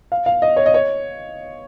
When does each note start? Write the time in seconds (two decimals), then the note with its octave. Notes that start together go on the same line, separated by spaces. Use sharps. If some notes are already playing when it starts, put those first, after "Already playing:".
0.12 F5
0.26 F5
0.42 D#5
0.57 C#5
0.66 D#5
0.74 C#5